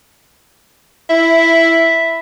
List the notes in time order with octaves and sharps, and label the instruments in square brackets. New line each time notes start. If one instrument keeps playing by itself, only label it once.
[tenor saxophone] E4 [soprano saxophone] E5